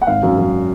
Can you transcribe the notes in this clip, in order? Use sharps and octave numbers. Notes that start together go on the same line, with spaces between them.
F#5
G#1 F5
F#2
F#2